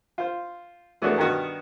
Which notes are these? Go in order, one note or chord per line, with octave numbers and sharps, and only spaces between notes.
F4 C5
E3 G#3 A3 B3 D4 F#4
G2 D#3 B3 D#4 F#4